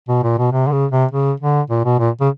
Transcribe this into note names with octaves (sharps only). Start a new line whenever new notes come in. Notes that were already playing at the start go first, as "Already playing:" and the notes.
B2
A#2
B2
C3
D3
C#3
C3
C#3
D3
A#2
B2
A#2
C#3